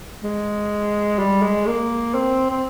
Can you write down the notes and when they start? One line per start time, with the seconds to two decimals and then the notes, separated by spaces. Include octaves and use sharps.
0.23 G#3
1.19 G3
1.42 G#3
1.66 A#3
2.14 C4
2.50 C4